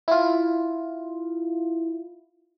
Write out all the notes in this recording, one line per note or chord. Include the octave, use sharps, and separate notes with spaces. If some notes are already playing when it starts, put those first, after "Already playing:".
E4 F4